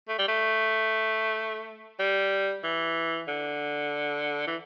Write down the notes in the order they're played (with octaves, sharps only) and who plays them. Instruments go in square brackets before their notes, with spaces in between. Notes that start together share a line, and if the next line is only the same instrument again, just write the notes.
[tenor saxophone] A3
G3
A3
G3
E3
D3
E3